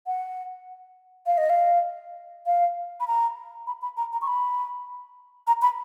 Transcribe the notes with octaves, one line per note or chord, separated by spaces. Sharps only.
F#5
F5
D#5
F5
F5
B5
A#5
B5
B5
A#5
A#5
C#6
B5
A#5
B5